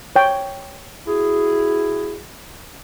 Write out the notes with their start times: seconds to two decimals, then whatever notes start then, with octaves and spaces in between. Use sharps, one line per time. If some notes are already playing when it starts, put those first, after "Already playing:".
0.16 C#5 G5
1.07 E4 F#4 G#4